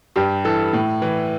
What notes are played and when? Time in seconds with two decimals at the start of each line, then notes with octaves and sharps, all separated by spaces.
0.16 G2 G4
0.45 E3 A4
0.73 A2
1.02 E3